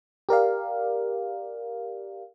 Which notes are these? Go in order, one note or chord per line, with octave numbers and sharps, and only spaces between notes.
G4 A#4 D5 F5